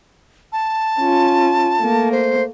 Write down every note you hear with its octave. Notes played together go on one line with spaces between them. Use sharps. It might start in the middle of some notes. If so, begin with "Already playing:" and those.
A5
C#4 F4
A3 A#3
C5